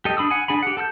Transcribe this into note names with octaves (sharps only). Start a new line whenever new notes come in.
G4 A4 D#5
D4 B5 D#6 E6
F#5 G#5
D4 G#4 G#5 B5
G4 F#5
A4 A5 E6 G6